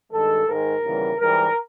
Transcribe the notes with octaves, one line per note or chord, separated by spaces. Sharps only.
G2 D#3 G#3 A4
G#2 D#3 G#3 A#4
D#2 C#3 E3 G3 B3
G#2 E3 G3 A#4